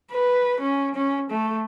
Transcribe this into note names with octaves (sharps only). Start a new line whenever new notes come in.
B4
C#4
C#4
A3